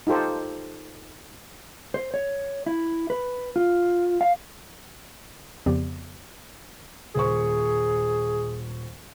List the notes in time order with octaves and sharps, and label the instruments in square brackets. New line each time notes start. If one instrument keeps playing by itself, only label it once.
[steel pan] D#4 F4 G4 A4 C5
[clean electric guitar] C5
C#5
E4
B4
F4
F5
[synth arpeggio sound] F2 C#3 F3 B3 G4 D5
[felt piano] D#1 C5 C#6 [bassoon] G#4